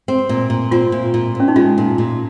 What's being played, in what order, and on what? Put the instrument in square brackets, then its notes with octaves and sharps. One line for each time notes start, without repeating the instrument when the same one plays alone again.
[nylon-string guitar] C4
A#2
A#2
[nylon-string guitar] C4 [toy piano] F4
[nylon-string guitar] A#2
A#2
[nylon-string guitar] A#2 [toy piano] C#4
[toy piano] D#4
[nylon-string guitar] G#3 [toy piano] F4
[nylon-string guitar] A#2
A#2